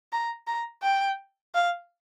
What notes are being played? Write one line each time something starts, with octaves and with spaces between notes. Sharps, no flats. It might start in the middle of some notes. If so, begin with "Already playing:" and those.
A#5
A#5
G5
F5